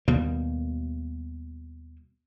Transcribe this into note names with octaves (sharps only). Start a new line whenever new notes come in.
D#2 B2 G3 A#3